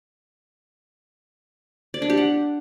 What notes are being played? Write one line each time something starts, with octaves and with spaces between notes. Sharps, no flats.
D5
D4
G4
F#5